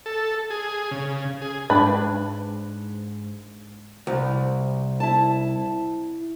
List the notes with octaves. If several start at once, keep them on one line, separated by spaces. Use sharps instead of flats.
A4
G#4
C#3
G#4
G#2 D4 B4 B5
C2
E4 A5